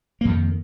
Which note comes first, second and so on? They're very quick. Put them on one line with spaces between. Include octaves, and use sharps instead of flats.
A#3 F2 D#3